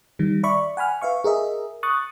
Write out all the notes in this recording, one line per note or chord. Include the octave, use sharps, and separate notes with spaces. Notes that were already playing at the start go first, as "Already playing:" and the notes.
D#3 G3
D5 E5 B5 C#6
F#5 G#5 B5 F6
B4 E5 F5 C#6
G#4 A#4 D#5 E5
C#6 D#6 F#6 A6